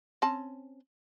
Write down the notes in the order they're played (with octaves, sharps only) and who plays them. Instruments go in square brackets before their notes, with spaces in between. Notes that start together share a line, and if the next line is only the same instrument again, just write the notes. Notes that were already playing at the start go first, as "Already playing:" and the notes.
[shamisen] C4 C#4 A5